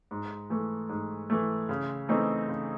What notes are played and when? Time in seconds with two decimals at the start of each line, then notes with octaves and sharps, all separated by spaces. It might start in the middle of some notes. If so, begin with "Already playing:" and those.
0.11 G#2
0.50 E3 A3
0.89 G#2
1.30 E3 A3
1.69 C#3
2.09 E3 A3 C4 D#4
2.48 C#3